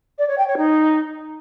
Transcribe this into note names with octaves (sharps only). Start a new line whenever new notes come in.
D5
C#5
G5
C#5
D#4